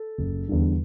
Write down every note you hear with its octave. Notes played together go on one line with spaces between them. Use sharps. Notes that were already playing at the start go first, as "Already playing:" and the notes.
Already playing: A4
F#1
E2 D3 G3